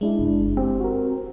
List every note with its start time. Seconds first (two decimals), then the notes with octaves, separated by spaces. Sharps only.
0.01 G#3 D4 E4
0.19 F#1
0.57 C4 G4
0.80 F#4 A#4